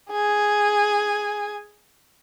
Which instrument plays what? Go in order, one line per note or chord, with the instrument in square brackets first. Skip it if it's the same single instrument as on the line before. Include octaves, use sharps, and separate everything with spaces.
[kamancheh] G#4 G#5